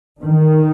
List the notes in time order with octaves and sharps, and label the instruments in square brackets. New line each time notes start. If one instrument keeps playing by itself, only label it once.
[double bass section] D#3